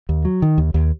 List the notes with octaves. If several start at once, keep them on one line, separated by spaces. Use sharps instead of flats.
D#2
F#3
D#3
D#2
D#2